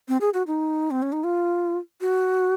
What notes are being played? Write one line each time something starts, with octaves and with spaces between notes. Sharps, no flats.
C4
G#4
F#4
D#4
C4
C#4
D#4
F4
F#4